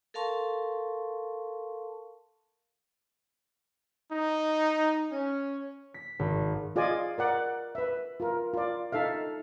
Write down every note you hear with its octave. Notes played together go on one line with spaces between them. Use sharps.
A4 A#4 F5 A5 C6 C#6
D#4
C#4
B6
G#1
F4 G#4 D5 D#5 G#5
A#4 D5 F#5
B4 E5
F4 A#4
F4 D5
D#4 A4 E5 F5